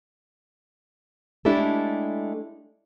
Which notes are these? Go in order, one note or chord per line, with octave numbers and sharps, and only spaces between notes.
G#3 A3 D4 E4 G4 A4